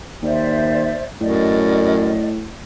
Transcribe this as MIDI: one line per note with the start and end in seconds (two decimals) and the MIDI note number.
0.22 0.99 39
0.22 1.03 72
0.22 1.03 74
0.22 1.03 76
1.21 2.22 42
1.21 2.47 45
1.21 2.26 74
1.21 2.26 75